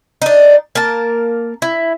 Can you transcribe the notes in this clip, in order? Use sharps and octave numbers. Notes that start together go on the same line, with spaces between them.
D4 D#4
A#3 A#4 A5
E4